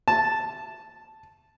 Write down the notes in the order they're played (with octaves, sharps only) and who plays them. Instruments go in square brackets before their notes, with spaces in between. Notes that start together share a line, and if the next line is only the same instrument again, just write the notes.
[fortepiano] A5